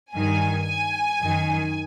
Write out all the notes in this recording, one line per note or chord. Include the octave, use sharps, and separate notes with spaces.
G2 D#3 G#5
G#5
F#2 D#3